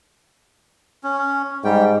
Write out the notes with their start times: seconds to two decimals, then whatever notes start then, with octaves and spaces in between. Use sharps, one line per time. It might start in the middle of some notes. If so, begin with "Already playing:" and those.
1.04 C#4
1.64 G#2 G3 G5